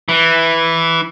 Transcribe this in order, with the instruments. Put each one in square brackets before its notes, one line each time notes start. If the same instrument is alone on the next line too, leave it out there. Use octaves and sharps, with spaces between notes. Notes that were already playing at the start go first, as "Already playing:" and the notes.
[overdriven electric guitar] E3